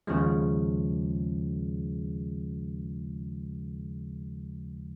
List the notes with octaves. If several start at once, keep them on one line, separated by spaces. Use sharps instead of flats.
D#2 C#3 F3 G#3